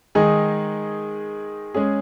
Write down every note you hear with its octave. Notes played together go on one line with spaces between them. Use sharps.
D#3 G#3 D#4 G#4
G#3 C#4 G#4